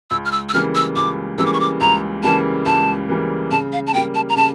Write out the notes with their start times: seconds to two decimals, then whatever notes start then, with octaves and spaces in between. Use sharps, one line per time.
0.10 C#2 E6
0.25 F6
0.32 E6
0.49 E6
0.53 C#3 E3 G3 A#3 F6
0.75 E6
0.96 C#2 D6
1.38 C#3 E3 G3 A#3 E6
1.46 D6
1.53 C#6
1.60 D6
1.81 C#2 A#5
2.23 C#3 E3 G3 A#3 A5
2.66 C#2 A5
3.09 C#3 E3 G3 A#3
3.51 C#3 A5
3.73 F5
3.87 A5
3.94 A#3 G5
3.97 G3
4.15 A5
4.29 A#5
4.36 C#3 A5